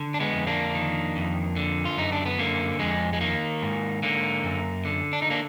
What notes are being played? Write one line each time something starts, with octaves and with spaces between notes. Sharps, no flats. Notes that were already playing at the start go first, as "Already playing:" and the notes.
Already playing: D3
D4
G#3 B3
F2
A#3 D4
D#3
F2
D3
F4
F#2 D#4
D4
B3
D3 A#3
F2 G#3
G#3
D#3 A#3
G#2
D3 A#3
F#2
D3
D4
D#4
A#3 D4